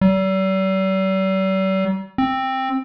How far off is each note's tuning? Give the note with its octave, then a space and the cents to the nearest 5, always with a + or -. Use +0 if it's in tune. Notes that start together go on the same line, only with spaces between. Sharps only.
G3 -45
C4 +10